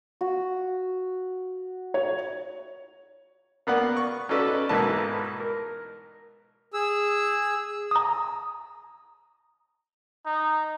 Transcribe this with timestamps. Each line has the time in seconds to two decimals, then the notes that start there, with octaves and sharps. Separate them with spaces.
0.21 F#4
1.94 C#5
3.67 A#3 B3 D5 F#5
3.97 C#6
4.29 C#4 D#4 F#4 A4 B4 D5
4.69 B1 G#2 E3 A#3 B4 A5
5.40 A#4
6.73 G#4 E6
7.91 A#5 D#6
10.26 D#4